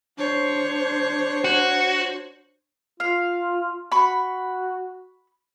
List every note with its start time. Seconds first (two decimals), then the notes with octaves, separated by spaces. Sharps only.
0.18 D4 C5 C#5
1.44 F#4
3.00 F4 F5
3.92 F#4 B5 C#6